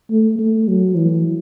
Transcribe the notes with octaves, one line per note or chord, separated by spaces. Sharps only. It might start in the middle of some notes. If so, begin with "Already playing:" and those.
A3
A3
F#3
E3